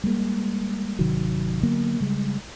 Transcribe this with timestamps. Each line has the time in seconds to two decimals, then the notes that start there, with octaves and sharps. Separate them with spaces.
0.04 G3 G#3 A#3
0.99 G#1 C3 D#3 F#3
1.63 D3 F#3 A#3 B3
2.00 C#3 G3 G#3